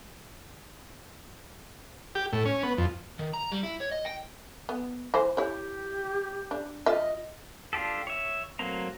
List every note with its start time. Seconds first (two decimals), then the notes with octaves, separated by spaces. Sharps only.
2.15 G4
2.33 A2
2.45 C#4
2.63 B3
2.78 F2
3.19 D#3
3.34 A#5
3.52 G3
3.64 E4
3.81 C#5
3.92 D#5
4.06 G5
4.69 B3
5.14 E3 C5
5.37 E4 G4 C#5
6.51 D4
6.86 F4 D#5 E5
7.73 D4 F4 G4 A4
8.07 C#5 E5
8.59 F#3 A3 A#3 C4 A#5